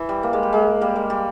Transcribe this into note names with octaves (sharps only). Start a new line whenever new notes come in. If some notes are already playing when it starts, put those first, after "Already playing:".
Already playing: E3
G3
A#3
G#3
G3
G#3
G3 A#3
G#3
G3